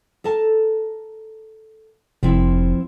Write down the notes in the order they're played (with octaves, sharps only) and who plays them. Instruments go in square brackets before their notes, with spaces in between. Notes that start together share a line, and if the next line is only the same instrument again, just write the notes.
[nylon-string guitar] A4 A#4 A5
[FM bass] F1 [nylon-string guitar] F3 C4 E4